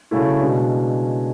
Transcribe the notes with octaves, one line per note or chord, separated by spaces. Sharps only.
C#3 F#3 A3 C#4 E4
B2 G#3 D4